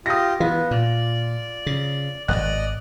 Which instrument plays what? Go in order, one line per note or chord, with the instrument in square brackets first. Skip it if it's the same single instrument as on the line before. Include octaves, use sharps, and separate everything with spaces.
[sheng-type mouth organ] F4 G4 [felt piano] D#6 A#6
[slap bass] E3 [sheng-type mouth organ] B3 [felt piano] F4
[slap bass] A#2 [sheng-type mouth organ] D5
[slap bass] C#3
[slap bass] D#1 G#1 [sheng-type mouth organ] D5 D#5 [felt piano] F#6